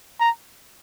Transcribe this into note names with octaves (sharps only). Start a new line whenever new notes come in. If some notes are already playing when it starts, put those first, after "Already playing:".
A#5